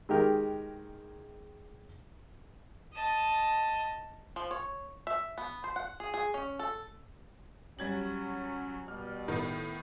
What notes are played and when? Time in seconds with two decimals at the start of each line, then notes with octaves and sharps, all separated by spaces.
0.09 D#3 G#3 D#4 G4 A#4
2.93 D#5 A5
4.36 F3
4.51 C#5
5.07 E5
5.38 B3
5.64 C5
5.76 F#5
6.00 G#4
6.14 G#4
6.34 C#4
6.59 A4
7.79 F#3 G3 C#4 G#6 F#7
8.88 B2 G3 F6
9.28 A2 D#3 B3